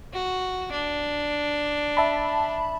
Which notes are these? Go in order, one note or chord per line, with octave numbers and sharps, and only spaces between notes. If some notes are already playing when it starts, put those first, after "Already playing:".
F#4
D4
E5 A5 B5